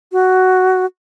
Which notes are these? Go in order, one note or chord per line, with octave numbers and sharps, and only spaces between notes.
F#4